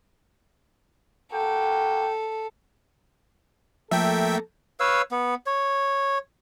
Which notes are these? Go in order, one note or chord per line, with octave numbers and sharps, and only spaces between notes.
A#3 F#4 A4 G5
F3 A3 A#3 A4 E5 G5
B4 C#5 F5 E6
B3
C#5